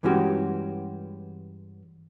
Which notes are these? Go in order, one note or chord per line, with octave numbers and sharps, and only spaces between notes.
G2 E3 G#3 C#4 F#4 G4